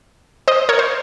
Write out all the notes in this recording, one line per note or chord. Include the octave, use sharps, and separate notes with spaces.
C5 D#5
A#4 C#5
C5